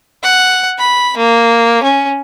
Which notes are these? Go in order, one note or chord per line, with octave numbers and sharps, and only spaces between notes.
F#5
B5
A#3
C#4